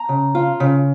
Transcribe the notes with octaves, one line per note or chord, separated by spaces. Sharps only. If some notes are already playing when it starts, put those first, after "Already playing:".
Already playing: A#5
C#3
F4
C#3